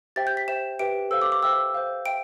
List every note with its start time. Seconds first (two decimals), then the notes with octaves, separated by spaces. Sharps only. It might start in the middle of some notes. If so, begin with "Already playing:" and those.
0.16 G4 C5 E5 G5 A6
0.27 G6
0.37 B6
0.48 C5 E5 G5 E7
0.79 G4 B4 E5 G5 D7
1.11 A4 C5 F5 E6
1.22 D6
1.32 D6
1.43 C5 E5 G5 E6
1.74 C5 F5
2.06 E5 G5 D7